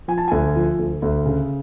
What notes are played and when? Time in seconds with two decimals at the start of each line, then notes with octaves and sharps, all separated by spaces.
0.08 F3 G#5
0.18 A5
0.28 D2 G#5
0.56 F3
0.79 D2
1.02 D2
1.26 C#3